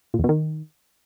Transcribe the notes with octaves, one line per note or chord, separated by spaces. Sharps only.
A#2
E2
B2
D#3